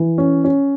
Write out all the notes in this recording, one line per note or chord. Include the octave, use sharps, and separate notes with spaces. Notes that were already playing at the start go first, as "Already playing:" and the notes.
Already playing: E3
C#4
C#4